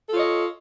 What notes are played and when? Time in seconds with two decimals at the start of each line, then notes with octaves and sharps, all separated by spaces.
0.08 A4
0.12 F4
0.16 C#5
0.19 D#5